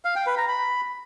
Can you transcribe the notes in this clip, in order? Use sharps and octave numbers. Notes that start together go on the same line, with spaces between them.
F5
G5
B4
A#5
B5